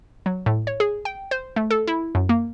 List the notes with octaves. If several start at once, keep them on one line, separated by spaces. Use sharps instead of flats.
F#3
A2
C#5
G#4
G5
C5
A3
A4
E4
F#2
A#3